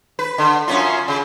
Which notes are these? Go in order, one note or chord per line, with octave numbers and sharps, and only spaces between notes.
B4
D3
F#2 C#4 F4
C#3